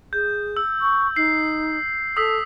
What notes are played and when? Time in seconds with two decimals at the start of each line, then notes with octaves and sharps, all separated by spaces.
0.13 G#4 G6
0.57 E6
0.80 C#6
1.16 D#4 E6 C7
2.17 A4 D#6 E6 B6